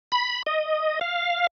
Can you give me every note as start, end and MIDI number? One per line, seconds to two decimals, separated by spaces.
0.12 0.43 83
0.46 0.99 75
1.01 1.47 77